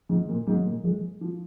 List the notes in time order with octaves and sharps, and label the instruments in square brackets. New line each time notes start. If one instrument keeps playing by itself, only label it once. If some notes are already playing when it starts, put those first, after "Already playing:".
[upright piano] G#2 [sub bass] F3
[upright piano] A#2
[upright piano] G#2 [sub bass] F#3
[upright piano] A#2
[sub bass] F3 [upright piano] G#3
[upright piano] F3